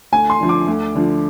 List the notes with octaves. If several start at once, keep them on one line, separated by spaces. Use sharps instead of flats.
D2 G#5
C6
D3 F3
D6
D2
D3 F3